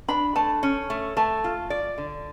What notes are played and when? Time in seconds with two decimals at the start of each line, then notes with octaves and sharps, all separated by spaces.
0.08 D4 B5
0.36 A3 A5
0.63 C#4
0.90 A3
1.17 A3 A5
1.44 F4
1.70 D5
1.98 D3